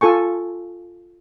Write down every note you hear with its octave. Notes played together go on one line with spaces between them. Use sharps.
F4 A4 G#5 C#6